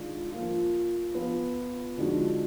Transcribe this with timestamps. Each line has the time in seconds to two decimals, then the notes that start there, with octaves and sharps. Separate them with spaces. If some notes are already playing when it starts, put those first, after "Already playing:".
Already playing: D#3 G#3 D4 F4
0.31 F3 A#3 F4
1.14 F3 B3 F4
1.97 D3 F3 G#3 D#4 F#4